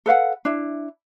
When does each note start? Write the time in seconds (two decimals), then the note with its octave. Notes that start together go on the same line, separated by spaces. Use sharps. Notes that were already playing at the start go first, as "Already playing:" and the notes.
0.06 A4 B4 F5 F#5
0.45 D4 E4